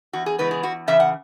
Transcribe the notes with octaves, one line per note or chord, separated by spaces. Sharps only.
E2 F#4
G#4
C#3 E3 G#3 B3 B4
G#4
E2 F#4
C#3 E3 E5
F#5